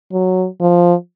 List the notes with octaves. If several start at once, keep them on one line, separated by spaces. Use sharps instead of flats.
F#3
F3